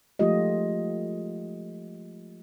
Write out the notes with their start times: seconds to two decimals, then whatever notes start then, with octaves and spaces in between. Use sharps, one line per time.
0.19 F3 G#3 A3 F4 G4 D#5